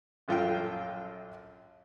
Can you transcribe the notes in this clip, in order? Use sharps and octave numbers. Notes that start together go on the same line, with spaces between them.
A#1 F#2 F4 A4 G5